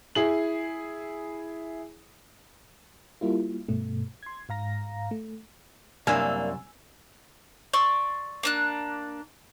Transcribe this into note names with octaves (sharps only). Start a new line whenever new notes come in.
E4 G#4 F#7
G3 A#3 E4 F4
G2 B2 A3
C6 G#6
G#2 F5 A#5 A#6
A3
C2 F#2 A#3 D4 G#5 E6
D5 C6 C#6 E6
A#3 D4 F#6